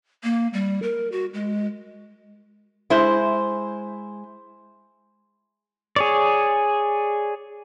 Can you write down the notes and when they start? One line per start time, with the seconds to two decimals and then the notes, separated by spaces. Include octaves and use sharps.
0.23 A#3
0.53 G3
0.83 A#4
1.12 F#4
1.34 G#3
2.90 G#3 E4 C5
5.96 G#4 C#5 D5